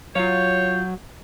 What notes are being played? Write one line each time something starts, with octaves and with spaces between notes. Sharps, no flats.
F#3 F4 C#5 F5 G6